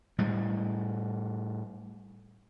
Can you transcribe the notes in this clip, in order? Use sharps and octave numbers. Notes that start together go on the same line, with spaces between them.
A2 G3 G#3